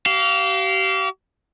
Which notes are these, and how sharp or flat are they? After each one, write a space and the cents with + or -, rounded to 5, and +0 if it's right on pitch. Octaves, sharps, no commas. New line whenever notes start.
G4 -40 F5 -10